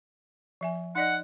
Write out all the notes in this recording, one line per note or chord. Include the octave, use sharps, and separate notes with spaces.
F3 E5 G#5
D#4 D5 D#5 F#5